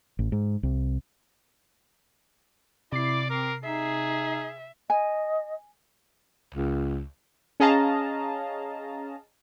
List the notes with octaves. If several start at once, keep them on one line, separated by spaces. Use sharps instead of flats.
A1
G#2
C2
C3 E4 D5 D6 C7
C4 A#4
D#4 G#4 E5
D#5 G#5
C#2
C#4 G#4 D#5 F5 A5 A#5